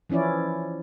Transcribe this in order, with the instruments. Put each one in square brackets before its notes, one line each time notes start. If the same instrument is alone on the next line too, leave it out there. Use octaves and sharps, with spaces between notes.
[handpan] E3 F3 C#4 E4 D5